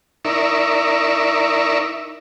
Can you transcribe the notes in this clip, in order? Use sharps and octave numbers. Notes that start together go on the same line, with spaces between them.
D#4 E4 A#4 D5 E5 C#6